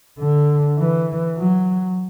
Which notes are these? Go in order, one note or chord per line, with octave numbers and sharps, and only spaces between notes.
D3
E3
F#3